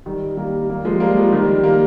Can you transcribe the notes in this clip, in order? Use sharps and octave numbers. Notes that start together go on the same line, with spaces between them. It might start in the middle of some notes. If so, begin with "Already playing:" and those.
D#3 G3
G3 A#3
G3 A#3
F3 G#3
G3 A#3
F3 G#3
D#3 G3
G3 A#3